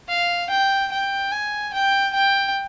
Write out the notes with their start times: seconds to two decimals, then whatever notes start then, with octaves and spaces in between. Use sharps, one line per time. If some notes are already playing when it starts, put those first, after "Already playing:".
0.09 F5
0.50 G5
0.92 G5
1.32 G#5
1.74 G5
2.14 G5